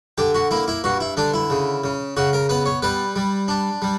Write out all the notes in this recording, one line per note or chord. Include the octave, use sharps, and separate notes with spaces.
D3 G4
F#4
A#3 E4
E4
G2 F#4
E4
D3 D4
E4
C#3
C#3
C#3 F#4
A#4
B3 B4
C#5
G3 B4
G3
D4
G3